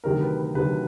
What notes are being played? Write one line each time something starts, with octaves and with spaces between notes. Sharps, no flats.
D2 C3 D#3 F#3 A#4
B4
B4
D2 C3 D#3 F#3 B4